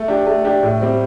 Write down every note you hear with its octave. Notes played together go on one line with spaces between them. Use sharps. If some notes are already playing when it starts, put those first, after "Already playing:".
Already playing: A3
D4 G4
A3
D4 G4
A2
G3 C4